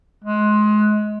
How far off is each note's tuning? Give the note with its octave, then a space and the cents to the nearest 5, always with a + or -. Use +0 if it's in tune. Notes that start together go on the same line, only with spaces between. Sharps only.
G#3 +25